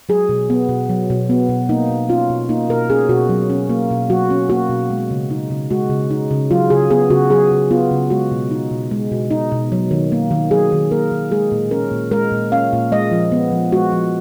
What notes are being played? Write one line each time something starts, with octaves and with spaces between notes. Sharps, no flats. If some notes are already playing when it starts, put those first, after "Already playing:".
F#3 G#4
B2
B3
B2
F#3
B2
B3
B2
A#3 D#4
B2
C#4 F4
B2
A#3 D#4
B2 A#4
C#4 G#4
B2 F#4
F#3
C#4
A#3
B2
F#3 F#4
C#4
A#3 F#4
B2
G#3
C#3
D#4
C#3
G#3 F#4
C#3
D#4
C#3
F#3 F4
C#3 G#4
B3 G#4
C#3 F#4
F#3 G#4
C#3
B3 F4
C#3
G#3 F#4
B2
D#4
B2
G#3
B2
D#4
B2
F#3
D#3
A#3
D#3
F#3 G#4
D#3
A#3 A#4
D#3
G#3 G#4
A#2
C#4 A#4
A#2
G#3 A#4
A#2
C#4 F5
A#2
G#3 D#5
F3
B3
F3
G#3 F#4
F3